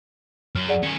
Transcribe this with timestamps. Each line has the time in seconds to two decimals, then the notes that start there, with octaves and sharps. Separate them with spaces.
0.55 F#2 F6 F#7 G7
0.68 G#4 D5 F#5
0.83 D#3 C#4 C#7